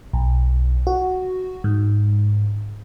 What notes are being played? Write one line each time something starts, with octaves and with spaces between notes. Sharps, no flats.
B1
F#4
G#2